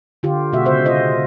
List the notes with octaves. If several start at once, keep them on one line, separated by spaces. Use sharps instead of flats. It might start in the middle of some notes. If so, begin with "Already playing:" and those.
D3 F4 G4
B2 G#3 F#4 E5
C#3 C5 E5
F4 C5 D#5